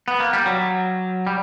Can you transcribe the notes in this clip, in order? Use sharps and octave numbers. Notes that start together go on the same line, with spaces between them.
B3
A#3
G3
F#3
G3